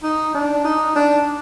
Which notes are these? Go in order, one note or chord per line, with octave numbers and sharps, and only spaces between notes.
D#4
D4
D#4
D4